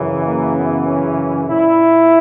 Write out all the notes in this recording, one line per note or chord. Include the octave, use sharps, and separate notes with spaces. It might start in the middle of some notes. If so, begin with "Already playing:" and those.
Already playing: F#2 C#3 E3
A#3
B3
C#4
A#2 E4